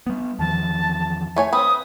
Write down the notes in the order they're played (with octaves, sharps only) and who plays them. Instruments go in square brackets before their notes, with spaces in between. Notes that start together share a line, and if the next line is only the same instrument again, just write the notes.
[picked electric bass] G3 B3
[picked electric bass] E2 D#3 F3 [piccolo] A5
[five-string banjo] A3 C#5 G#5
[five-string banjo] C4 B4 [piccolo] D#6